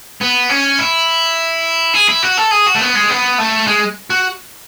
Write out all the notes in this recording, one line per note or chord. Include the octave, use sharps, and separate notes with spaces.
B3
C#4
E4
G#4
E4
F#4
A4
G#4
F#4
A3
B3
G#3
B3
A3
G#3
F#4